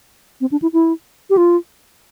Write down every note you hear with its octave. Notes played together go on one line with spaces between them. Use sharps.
C4
D4
E4
E4
G4
F4